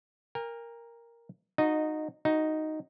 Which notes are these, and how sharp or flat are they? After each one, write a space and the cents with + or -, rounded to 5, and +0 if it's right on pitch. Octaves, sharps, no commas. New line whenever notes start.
A#4 +0 G#5 -45
D#4 -15 F#4 -30 D#5 +0
D#4 +0 F#4 +0